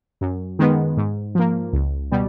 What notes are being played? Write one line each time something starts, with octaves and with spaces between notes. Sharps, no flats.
F#2
D#3 G#3 B3
G#2
F3 A#3
C#2
B2 G3